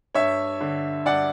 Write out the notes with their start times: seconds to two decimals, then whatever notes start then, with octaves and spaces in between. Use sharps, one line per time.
0.15 G2 C#5 E5
0.61 D3
1.05 G2 D5 F#5